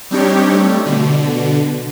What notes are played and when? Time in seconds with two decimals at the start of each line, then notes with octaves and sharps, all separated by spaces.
0.11 G3 C4 D4 D#4 G4 C#5
0.53 G3 A3
0.85 B2 D3